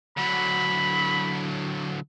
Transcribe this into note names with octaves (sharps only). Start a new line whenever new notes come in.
D3 F#3 B5